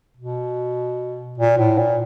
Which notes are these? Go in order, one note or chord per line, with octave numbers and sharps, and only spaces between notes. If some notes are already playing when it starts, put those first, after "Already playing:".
B2
A#2
A2
A#2